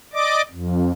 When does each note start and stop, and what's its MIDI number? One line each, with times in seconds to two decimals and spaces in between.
0.13 0.42 74
0.13 0.42 75
0.13 0.42 86
0.51 0.92 41